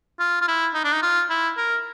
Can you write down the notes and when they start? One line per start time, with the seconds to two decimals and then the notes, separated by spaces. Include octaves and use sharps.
0.20 F4
0.41 F4
0.48 E4
0.74 D#4
0.84 D4
0.93 D#4
1.02 F4
1.30 E4
1.57 A#4